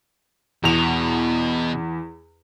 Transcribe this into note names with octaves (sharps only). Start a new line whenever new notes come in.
E2 B2 F7